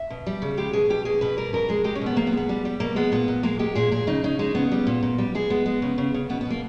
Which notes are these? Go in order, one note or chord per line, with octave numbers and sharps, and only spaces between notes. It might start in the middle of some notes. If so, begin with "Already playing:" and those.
Already playing: E5
B2
G3
C#3
G#3 G4
B2 G#4
B2 G4
B2 G#4
B2 B4
G3 A#4
B2 A#4
G#3 G#4
G#3 G4
C#4
B2 B3
B2 A#3
B3
G#3
B3
G3
G3
B2 A#3
G#3 B3
A#2 B3
A#2
G#3 A#3
G#3 G4
A#2 G#4
A#2 G#4
C#3 D#4
C#3 D#4
G#3 D#4
C#3 B3
G3
A#2
A#2
G3
G#3 G#4
G#3 B3
G#3
C#3
C#3
C#3
B2 B3
B2 B3
A#3